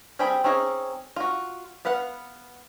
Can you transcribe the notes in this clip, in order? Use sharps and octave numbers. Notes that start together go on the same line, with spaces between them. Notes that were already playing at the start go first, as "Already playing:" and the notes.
G3 C4 G#4 G5 B5
C4 C#4 D#4 G#4
F4 F#4
B3 B4 F5 F#5